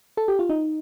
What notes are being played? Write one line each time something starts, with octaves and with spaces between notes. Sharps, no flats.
A4
G4
F4
D#4